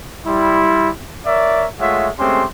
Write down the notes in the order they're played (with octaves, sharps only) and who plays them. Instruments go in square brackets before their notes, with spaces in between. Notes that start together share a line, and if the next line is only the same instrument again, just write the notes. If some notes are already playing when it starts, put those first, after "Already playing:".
[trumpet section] G3 E4 C6
A#4 C#5 D5 E5
G#3 A3 F4 C#5 E5 F#5
G#3 A3 C4 C#4 G4 C6